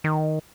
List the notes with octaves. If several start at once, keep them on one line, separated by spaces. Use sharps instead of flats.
D#3